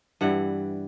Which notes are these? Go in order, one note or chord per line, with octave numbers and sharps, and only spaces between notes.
G2 E3 G3 F#5